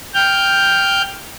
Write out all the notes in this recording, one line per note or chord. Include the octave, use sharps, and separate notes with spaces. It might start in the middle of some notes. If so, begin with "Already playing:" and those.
G5 F6 G6